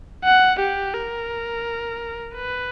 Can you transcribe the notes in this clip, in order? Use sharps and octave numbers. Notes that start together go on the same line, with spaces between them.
F#5
G4
A#4
B4